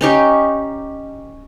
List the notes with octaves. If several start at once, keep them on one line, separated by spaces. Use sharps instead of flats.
C#4 D#4 G4